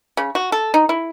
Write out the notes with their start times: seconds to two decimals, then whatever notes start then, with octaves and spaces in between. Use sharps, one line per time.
0.17 C#3
0.35 F#4
0.52 A4
0.74 D#4
0.89 E4